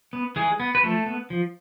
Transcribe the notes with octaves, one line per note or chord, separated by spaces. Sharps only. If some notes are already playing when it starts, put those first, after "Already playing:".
B3
E3 G#3 G#4
B3
B4
F3 A3 A4
B3
F3